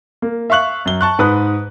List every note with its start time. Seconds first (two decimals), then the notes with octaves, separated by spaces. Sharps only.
0.22 A#3
0.50 E5 F5 C#6 F#6 F#7
0.85 F#2 G7
1.01 A5 C#6 F#6
1.19 G#2 B4 D#6 F#6